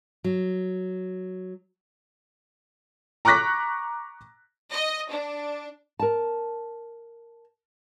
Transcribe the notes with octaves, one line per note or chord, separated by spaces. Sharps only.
F#3
A#5 C#6 D6 F#6 A#6 B6
D#5
D4
A#4 A5